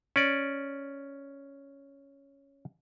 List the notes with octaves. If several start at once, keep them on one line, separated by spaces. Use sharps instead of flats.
C#4 D5